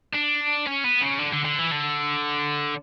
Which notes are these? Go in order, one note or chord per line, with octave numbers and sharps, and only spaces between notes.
D4
C#4
B3
C#3
D3
D3
D3
E3
D3